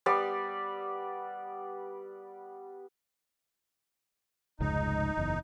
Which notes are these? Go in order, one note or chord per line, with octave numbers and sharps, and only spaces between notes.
G3 B3 D5
F1 C#2 G#2 D#4
F#1 E2